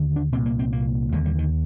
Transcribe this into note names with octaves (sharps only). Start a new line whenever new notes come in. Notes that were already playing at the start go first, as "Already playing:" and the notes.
Already playing: D#2 D3
D4
C2 A#2 C4
A#3
C4
A#3
D#2 D3 G#3
G3
D#3